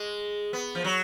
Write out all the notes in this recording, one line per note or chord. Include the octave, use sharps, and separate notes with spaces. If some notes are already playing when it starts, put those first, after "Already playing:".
Already playing: G#3
B3
F3
F#3